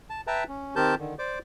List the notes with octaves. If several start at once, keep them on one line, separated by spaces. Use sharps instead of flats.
A5
B4 E5 G5 A5 A#5
C#4
D#3 C4 G4 A#4 A5 G6
D3 D#3
C5 D5 D6